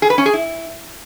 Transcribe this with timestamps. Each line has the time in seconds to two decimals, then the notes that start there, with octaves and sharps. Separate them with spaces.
0.02 G#4
0.10 B4
0.18 C#4
0.26 G#4
0.33 E4